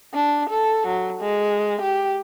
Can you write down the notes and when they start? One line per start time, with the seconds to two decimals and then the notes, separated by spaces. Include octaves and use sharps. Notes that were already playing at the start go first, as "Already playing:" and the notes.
0.14 D4
0.50 A4
0.88 F#3
1.21 G#3
1.82 G4